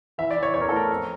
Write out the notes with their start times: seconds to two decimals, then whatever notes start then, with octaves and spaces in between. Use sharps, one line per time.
0.18 E3 E5
0.31 D5
0.36 E3
0.43 C#5
0.54 E2 C#5
0.61 A#4
0.69 A4
0.73 A3 A#4
0.91 F2